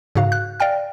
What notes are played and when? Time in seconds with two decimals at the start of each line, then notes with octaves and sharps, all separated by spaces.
0.15 G#2 C#3 F#4 F5
0.32 F#6
0.60 D5 F5 G5 F6